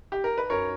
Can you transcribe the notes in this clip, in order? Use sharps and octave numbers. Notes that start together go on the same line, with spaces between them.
G4
A#4
B4
F#2 A#4 C#5